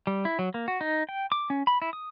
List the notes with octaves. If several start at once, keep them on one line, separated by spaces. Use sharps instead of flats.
G3
E4
F#3
A#3
F#4
D#4
G5
D6
C#4
B5
E4
D#6